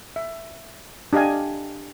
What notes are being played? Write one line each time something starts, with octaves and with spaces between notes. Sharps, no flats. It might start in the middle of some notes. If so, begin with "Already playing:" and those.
E5
D4 G4 D#5 F5 G#5